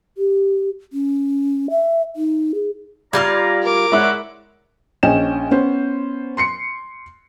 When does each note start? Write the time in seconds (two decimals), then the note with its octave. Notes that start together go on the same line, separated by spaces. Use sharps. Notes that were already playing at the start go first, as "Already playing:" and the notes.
0.18 G4
0.93 C#4
1.70 E5
2.16 D#4
2.54 G#4
3.13 G3 F4 D5 F5 A#5 F6 G#6
3.62 A#4 D6
3.92 G#3 E4 C#5 D5 F#5
5.03 A#1 C#4 D#5 G5 G#5 E7
5.51 B3 C#4 C5
6.37 C6 C7 C#7